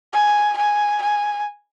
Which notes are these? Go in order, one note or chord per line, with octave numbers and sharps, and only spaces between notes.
G#5
G#5
G#5